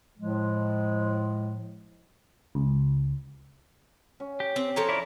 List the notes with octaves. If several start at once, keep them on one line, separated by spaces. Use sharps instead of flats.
A2 F3 G#3
C#2
C#4
G4
C4
F3 A4 C#5 A#5
E4 D5